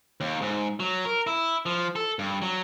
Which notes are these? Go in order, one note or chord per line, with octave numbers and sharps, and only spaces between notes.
D#2
G#2
F#3
A#4
E4
F3
A4
G2
F#3